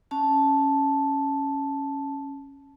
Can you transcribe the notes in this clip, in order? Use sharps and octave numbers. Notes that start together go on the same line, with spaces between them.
C#4 A5